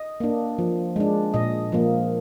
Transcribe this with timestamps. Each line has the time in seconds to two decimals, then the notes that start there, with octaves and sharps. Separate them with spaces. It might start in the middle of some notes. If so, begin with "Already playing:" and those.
Already playing: D#5
0.20 A#3 D4
0.58 F3
0.96 G#3 D4
1.34 A#2 D#5
1.72 F3 A#3